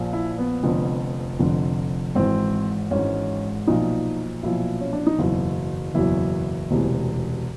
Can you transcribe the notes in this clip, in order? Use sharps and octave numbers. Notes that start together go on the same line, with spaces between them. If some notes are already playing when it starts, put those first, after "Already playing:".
Already playing: A#1 A#2 F3
E4
B3
F1 F2 D3
F1 F2 D3
G#1 G#2 E3 C4
G#1 G#2 E3 C#4
B1 A#2 F3 D#4
B1 A#2 F3 E4
C#4
D4
D#4
F#1 E2 B2 F#3 E4
F#1 E2 B2 F#3 E4
E1 D2 C3 E3